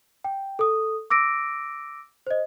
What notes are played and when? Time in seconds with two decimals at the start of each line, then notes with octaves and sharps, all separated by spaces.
0.24 G5
0.59 A4 D#6
1.10 D6 E6 A#6 D7
2.27 C5 D#5